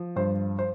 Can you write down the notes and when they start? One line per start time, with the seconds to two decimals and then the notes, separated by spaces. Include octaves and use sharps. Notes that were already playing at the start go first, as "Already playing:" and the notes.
Already playing: F3
0.16 G2 C5
0.59 C5